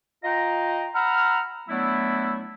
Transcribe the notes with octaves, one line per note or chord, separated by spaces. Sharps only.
F4 D#5 F5 G5 A#5
F#5 A#5 B5 E6 F6
F#3 A3 B3 D4 E4